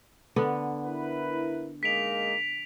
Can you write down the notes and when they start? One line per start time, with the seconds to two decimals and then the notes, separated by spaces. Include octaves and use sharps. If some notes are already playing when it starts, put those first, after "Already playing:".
0.36 D3 B3 D4
0.86 E4 A#4 B4
1.83 G#3 A#3 D#4 B6 D7 F7